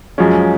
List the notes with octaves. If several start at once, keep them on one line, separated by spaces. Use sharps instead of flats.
F#2 F3 G#3 C#4